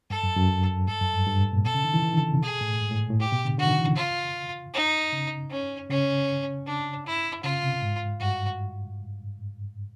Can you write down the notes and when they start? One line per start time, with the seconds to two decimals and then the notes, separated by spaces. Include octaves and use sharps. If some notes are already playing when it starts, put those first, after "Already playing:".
0.10 G2 A4
0.23 F#2
0.36 F#2
0.88 G2 A4
1.01 F#2
1.13 G2
1.26 G2
1.39 G#2
1.52 A#2
1.65 B2 A4
1.74 C#3
1.85 D#3
1.94 E3
2.04 E3
2.13 D3
2.23 C#3
2.33 C3
2.42 B2 G#4
2.61 A2
2.81 G#2
2.90 A2
3.00 A#2
3.10 A2
3.20 A2 G4
3.32 B2
3.45 D3
3.58 D3 F#4
3.67 D#3
3.77 E3
3.87 C#3
3.96 F4
4.74 D#4
5.12 C#3
5.50 C#4
5.89 C#3 C#4
6.67 D4
7.06 E4
7.43 C#3 F4
7.63 C3
7.82 G#2
8.20 G2 F#4